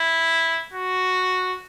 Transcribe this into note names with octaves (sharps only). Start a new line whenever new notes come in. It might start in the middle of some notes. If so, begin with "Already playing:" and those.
Already playing: E4
F#4